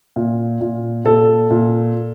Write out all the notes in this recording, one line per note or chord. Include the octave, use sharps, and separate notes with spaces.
A#2
A#2
A#2 A4
A#2